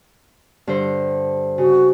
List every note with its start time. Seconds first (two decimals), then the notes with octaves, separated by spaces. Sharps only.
0.67 G2 D3 C5
1.58 C#3 F#4